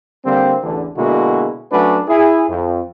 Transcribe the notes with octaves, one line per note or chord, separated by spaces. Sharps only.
D3 G3 A#3 C4
A1 E2 D3
B2 D3 G#3 A#3 E4 F#4
F#3 A3 C#4 D4 F#4 B4
E4 G#4
F2